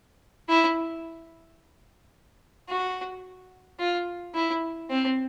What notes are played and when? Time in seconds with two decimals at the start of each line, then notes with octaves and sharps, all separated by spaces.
0.48 E4
2.69 F#4
3.79 F4
4.34 E4
4.90 C4